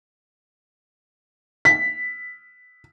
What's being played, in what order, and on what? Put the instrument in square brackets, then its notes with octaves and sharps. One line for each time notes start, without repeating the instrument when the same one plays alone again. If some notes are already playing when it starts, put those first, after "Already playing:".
[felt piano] B6